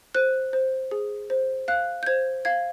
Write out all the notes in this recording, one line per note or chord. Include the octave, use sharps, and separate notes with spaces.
C5 F#6
C5
G#4
C5
F5 F#6
G6
C5 G#6
F5 G#6